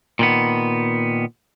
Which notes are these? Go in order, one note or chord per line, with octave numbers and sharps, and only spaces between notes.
A#2 D#3 B3